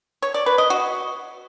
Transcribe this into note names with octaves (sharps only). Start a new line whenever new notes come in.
C#5
D5
B4
D#5
F#4